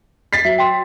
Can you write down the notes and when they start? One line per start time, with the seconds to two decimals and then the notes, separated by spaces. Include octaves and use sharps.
0.33 A6 B6 C7
0.45 F#3 E5
0.58 G5 C6